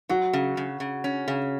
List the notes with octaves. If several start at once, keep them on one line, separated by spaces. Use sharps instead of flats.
F#3 F#4
C#3
C#3
C#3
C#4
C#3